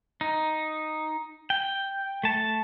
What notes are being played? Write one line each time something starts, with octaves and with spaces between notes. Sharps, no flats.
D#4
G5
A3 A5